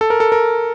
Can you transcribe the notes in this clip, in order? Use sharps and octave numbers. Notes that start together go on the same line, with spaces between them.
A4
A#4
A4
A#4